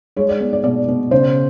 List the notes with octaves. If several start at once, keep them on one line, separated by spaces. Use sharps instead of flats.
G#3 C#5
D5
B3
D5
B2 D5
B2
C#3 C5